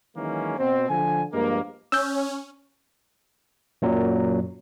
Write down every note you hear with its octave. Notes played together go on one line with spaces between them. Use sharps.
D#3 E3 F#3 G#3 A#3 C#4
B2 C4
D3 F3 G#5
G2 F3 G#3 A#3
C#4 E6 G6
F#2 A#2 F#3